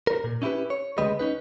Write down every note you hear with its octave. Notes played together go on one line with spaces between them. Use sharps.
A#4
A#2
C#4 D#4 E4 G4 B4
C#5
D2 C#3 G#3 G4 B4 D#5
C#4 D#4 B4